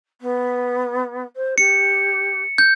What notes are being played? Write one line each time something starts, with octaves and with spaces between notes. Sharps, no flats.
B3
C5
G4 C#7
G6